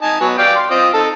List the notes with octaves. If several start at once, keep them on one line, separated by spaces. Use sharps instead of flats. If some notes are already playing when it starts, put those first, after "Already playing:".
D#4 G#5 A5
F#3 B3
D5 F5 G5
C6
C4 F4 D#5
D#4 A4